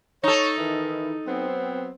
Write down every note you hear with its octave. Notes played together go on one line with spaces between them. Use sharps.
D#4 A4 C#5
D#3 E3 E4
F#3 B3 C4